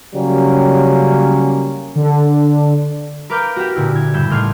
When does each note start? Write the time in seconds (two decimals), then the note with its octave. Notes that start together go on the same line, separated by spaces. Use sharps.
0.15 C#3 F#3 G3 A#3 C#4
1.96 D3
3.30 A#4 B4 F5 D6 F6 G6
3.56 F#4 G4
3.76 A#2 D3 E4
3.95 G#6
4.14 G2 C#3 G3 G6 E7
4.30 A1 D#4 F6 G#6 C7